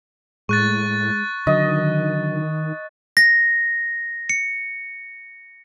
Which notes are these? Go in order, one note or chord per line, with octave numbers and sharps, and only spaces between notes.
A2 G#3 C#6 F#6 A6
D3 D#3 F#3 D#5
A#6
C#7